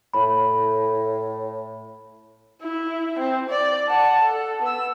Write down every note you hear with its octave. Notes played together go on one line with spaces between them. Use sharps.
A2 B5
E4
C4
D5
F#5 A5
A4
B3 E6